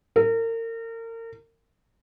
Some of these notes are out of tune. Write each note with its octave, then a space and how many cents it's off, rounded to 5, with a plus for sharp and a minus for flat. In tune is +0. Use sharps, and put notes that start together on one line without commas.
A#4 -35